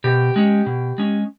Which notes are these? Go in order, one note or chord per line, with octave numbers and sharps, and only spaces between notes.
B2 G4
G#3 C#4
B2
G#3 C#4